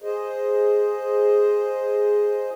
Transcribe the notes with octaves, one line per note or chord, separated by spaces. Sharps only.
G#4 C5 D#5